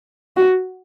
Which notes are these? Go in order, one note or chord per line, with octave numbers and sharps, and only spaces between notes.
F#4